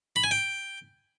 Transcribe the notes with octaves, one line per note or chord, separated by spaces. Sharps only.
B5
G#5
G5